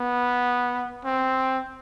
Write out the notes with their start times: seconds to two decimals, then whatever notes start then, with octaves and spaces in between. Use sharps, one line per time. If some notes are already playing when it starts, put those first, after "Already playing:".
Already playing: B3
1.05 C4